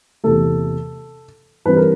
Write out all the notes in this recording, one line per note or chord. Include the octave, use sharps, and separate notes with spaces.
E2 C3 E3 A3 A4
G2 E3 G3 C4 B4
A#4